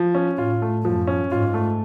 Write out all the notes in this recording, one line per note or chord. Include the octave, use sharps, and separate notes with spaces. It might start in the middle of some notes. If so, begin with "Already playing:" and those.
Already playing: F3
C#4
A2 F4
A3
F#2 F3
C#4
G#2 F4
A3